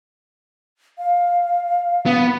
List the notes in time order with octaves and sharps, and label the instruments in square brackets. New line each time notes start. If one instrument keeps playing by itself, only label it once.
[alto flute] F5
[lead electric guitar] B3